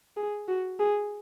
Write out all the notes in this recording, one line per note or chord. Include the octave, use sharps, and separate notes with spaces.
G#4
F#4
G#4